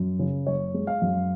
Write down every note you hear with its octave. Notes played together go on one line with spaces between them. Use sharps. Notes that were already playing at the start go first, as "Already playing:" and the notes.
Already playing: F#2
C#3
F#1 C#5
G#3
F5
F#2